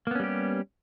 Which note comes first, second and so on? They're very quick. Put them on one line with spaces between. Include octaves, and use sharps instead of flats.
A#3 B3 C#4 G3 G4